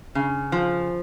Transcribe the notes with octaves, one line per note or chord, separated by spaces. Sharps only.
C#3
F3